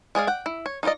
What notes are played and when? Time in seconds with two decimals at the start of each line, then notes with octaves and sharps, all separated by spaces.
0.15 G#3 G#4 D5 F5
0.27 F#5 G5
0.46 E4
0.66 C#5
0.83 D#4 F4 C5 D5 D#5